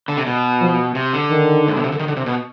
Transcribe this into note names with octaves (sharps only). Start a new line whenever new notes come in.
D3
C3
B2
F3
C3
D3
D#3
G#2
B2
C3
D3
D#3
D3
C3
B2